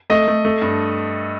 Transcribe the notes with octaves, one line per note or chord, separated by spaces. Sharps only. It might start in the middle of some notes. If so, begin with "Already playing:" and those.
A3 D#5
A3
A3
G2